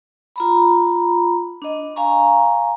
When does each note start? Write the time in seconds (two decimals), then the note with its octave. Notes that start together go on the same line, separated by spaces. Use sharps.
0.36 F4 A#5 B5
1.62 D4 D#5
1.96 F5 G#5 A#5 C#6